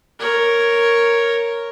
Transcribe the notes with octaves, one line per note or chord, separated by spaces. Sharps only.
A#4 C#5